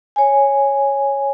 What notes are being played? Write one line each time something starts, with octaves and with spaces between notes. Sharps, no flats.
C#5 G#5